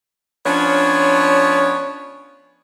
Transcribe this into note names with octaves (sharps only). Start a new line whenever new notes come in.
F3 B3 C#4 D4 C#5